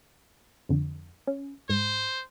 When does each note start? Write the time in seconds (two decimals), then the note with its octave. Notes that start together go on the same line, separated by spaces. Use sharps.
0.69 F2 D3
1.27 C#4
1.69 G#2 C5